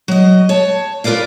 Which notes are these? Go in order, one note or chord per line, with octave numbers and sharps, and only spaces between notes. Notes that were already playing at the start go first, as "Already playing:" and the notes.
F#3 D#5
C#5 A5
F4 A#4 B4 D5 F5